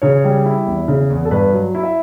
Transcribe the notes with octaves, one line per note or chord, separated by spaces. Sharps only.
C#3 C#5
G3
E4
E2
C#3
E2
A4
G2 B4
F#3
E4
E5